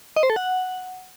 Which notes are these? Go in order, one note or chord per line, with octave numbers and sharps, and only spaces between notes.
D#5
C5
A4
F#5